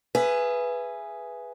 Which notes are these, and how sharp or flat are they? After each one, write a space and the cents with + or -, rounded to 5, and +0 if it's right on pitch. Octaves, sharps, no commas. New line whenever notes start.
G#4 +0 B4 +0 E5 +30